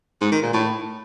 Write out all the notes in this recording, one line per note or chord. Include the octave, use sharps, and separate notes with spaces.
G#2
D#3
A#2
A2